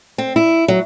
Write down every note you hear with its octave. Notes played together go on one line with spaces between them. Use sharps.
C4
E4
F#3